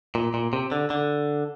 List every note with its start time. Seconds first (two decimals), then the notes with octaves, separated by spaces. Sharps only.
0.15 A#2
0.34 A#2
0.53 C3
0.72 D3
0.90 D3